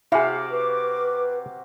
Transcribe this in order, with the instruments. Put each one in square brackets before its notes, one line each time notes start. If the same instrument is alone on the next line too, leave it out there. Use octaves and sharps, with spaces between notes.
[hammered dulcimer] C3 F#4 F5 [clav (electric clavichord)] E4 G#4 [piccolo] D6
[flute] B4